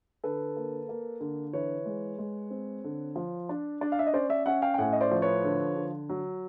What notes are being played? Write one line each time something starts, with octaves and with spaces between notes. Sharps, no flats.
D3 A4 B4
A#3
A#3
D3
E3 B4 C#5
G#3
G#3
C4
D3
F3
D4
D4
F5
E5
D#5
C#4 C5 D5
D5 E5
C#4 E5 F#5
F5 G5
G5
A2 F#5 G#5
D#5
C5 D5
F3
B4 C#5
D3
D3
F#3